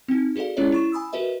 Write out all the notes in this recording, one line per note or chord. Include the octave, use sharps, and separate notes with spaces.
C4 D#4
F#4 G#4 A4 D5 F5
G#3 C#4 E4 G#4 C#5 D5
E4 C#6 E7
G#5 B5 D#6 E6
F#4 A#4 B4 D#5 E5